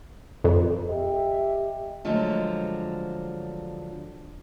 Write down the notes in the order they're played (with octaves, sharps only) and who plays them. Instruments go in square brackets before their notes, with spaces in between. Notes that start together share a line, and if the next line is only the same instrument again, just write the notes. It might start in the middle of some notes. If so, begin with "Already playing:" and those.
[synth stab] F2
[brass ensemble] G4 D#5 E5
[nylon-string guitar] D3 F3 F#3 G#3 A3